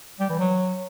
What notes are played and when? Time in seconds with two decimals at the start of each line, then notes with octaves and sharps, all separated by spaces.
0.20 G3
0.30 E3
0.39 F#3